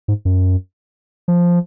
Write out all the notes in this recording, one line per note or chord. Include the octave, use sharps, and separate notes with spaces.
G#2
F#2
F3